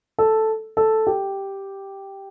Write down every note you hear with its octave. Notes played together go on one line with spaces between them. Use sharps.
A4
A4
G4